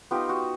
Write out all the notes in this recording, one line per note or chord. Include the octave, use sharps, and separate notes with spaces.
B3 D#4 F4 G4
F#4